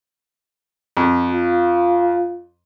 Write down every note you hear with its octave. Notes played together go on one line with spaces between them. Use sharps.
F2
F4